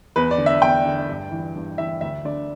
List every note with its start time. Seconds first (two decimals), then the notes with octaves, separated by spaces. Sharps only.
0.16 E2 B4
0.31 D5
0.38 D3
0.46 E5
0.62 E2 G5
0.85 D3
1.09 G2
1.32 E3
1.56 G2
1.78 E3 E5
2.01 D2 E5
2.25 D3 D5